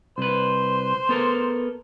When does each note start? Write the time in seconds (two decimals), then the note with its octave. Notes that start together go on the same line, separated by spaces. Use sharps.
0.18 C2 B4 C5
1.09 B3 A4 A#4